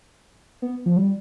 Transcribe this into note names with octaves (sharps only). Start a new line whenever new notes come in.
B3
F3
G3